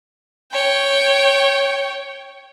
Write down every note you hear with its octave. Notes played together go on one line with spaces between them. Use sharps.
C#5 G5